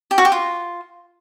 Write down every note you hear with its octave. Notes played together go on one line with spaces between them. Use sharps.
G4
F#4
G4
F4